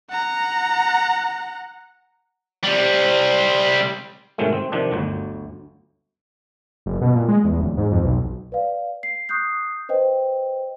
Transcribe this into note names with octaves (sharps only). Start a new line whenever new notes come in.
F#5 A#5
C3 G3
G#2 C3 D#3 F#3 G#3 A3
C4
C3 D#3 F3 D4
G1 D2 F#3
F#1
B2
A#2
G#3
E2
D1
G#2
F2
B1
B4 D5 F5
C7
C#6 D#6 F#6 G6 C7
B4 C5 D#5 G5